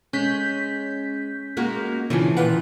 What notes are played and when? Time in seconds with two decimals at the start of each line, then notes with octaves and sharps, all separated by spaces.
0.13 G#3 C#4 G6 B6
1.57 G#3 A#3 F#4
2.10 C#3 E3 F3 D4
2.37 A#2 D#3 F4 B4 F#5